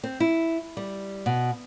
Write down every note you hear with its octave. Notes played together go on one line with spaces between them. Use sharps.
C4
E4
G3
B2